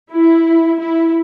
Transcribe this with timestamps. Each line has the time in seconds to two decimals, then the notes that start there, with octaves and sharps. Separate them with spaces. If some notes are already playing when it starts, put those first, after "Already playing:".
0.12 E4
0.81 E4